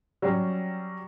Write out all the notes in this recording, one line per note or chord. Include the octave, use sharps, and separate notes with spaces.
F#3 G3 C#4